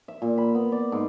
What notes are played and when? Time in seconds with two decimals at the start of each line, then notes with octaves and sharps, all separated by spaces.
0.08 E5
0.22 A#2
0.38 B5
0.55 B3
0.72 D5
0.92 G#2